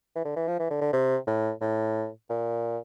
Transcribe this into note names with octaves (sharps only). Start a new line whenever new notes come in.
E3
D3
E3
F3
E3
D3
D3
C3
A2
A2
A#2